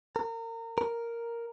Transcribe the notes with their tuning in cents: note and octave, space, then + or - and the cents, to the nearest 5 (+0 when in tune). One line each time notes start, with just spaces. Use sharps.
A#4 -30
A#4 +0